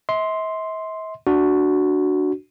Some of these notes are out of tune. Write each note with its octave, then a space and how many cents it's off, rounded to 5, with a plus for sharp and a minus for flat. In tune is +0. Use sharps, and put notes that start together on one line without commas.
E5 -45 C6 +0
D4 +0 F#4 +0